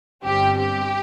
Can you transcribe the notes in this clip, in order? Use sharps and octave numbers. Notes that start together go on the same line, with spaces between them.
G1 G2 G3 C4 G4
G4